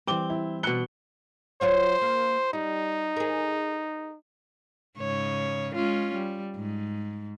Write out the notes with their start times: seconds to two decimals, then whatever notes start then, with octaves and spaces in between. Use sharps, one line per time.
0.07 E3 G3 C4 D6 G7
0.30 E4
0.63 B2 D4 F#6 C#7 G7
1.61 F#3 F4 C5 C#5
2.01 A#3
2.53 G3 D#4
3.17 G#4 A#4
4.98 G#2 C#3 C#5
5.75 G#3 C#4 F4
6.14 G3
6.56 G#2